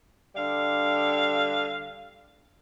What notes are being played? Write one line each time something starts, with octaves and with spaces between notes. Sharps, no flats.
D3 G3 F5